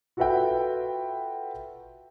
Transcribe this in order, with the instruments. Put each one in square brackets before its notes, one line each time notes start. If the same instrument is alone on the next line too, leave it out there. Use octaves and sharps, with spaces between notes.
[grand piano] F4 F#4 A4 B4 E5 G5